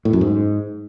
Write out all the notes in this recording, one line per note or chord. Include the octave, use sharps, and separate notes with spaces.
A2
F#2
G#2